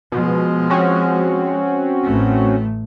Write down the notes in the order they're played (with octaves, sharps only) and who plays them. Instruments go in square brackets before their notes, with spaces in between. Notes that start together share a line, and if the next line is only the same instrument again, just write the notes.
[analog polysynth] B2 [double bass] F3 G#3
[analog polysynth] C4 C#4 F#4
[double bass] A1 A3